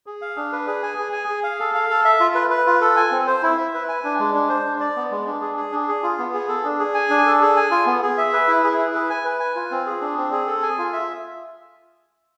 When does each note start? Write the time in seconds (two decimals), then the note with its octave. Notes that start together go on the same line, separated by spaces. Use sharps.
0.06 G#4
0.22 F5
0.37 D4
0.52 B4
0.67 G#4
0.83 G#5
0.98 G#4
1.12 G#5
1.28 G#4
1.44 F5
1.59 A4
1.75 F5
1.90 A4
2.05 E5
2.20 F4
2.35 B4
2.50 B4
2.66 F4
2.81 A4
2.96 G#5
3.12 C4
3.27 C5
3.43 E4
3.58 E5
3.74 B4
3.88 G#5
4.04 D4
4.19 G#3
4.34 D4
4.49 C5
4.66 D4
4.80 D5
4.96 B3
5.11 G#3
5.26 D4
5.41 G#4
5.57 G#4
5.72 D4
5.88 G#4
6.03 F4
6.18 B3
6.34 G#4
6.48 A4
6.64 D4
6.79 G#4
6.94 G#5
7.10 D4
7.26 A4
7.41 G#4
7.56 G#5
7.71 F4
7.86 B3
8.02 G#4
8.18 E5
8.33 B4
8.48 E4
8.64 G#4
8.78 E4
8.94 B4
9.10 G#5
9.25 B4
9.40 G#5
9.55 F4
9.71 C4
9.86 G#4
10.01 D4
10.17 C4
10.32 G#4
10.47 A4
10.62 G#5
10.78 F4
10.93 E5